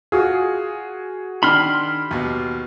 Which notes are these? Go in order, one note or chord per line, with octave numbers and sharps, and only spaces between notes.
F4 F#4 G#4
D#3 D4 D#4 B5 C6 F6
D#2 B2